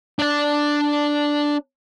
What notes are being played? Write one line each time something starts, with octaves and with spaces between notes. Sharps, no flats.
D4 D5